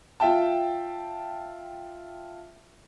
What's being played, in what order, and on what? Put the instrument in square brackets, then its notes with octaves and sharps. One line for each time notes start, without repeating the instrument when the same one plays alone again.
[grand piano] F4 E5 G5 A5